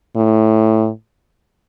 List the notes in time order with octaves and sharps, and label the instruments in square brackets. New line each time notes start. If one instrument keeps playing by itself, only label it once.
[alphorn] A2